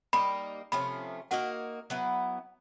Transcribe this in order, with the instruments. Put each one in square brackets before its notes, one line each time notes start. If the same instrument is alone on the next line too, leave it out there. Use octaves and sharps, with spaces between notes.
[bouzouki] G3 A#3 D#4 [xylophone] B5
[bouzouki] C3 F3 A3 C#4 [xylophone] B5
[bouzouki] A#3 D#4 F#4 A#4 [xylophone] F#5
[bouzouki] F#3 B3 E4